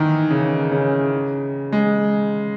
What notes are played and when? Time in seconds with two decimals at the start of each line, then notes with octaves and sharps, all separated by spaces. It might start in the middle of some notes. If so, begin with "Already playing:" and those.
Already playing: D#3 E3
0.31 C#3
0.72 C#3
1.72 G#3